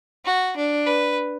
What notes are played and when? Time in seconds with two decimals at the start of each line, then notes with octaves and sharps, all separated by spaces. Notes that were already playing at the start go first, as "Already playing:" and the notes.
0.25 F#4
0.57 D4
0.86 B4